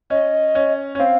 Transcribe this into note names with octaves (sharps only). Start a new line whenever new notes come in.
C#4 D#5
C#4
C#4
C4 F5